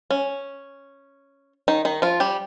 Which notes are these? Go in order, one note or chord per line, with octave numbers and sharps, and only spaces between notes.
C#4
D#3 D#4
D#3 D#4
F3 F4
G3 G4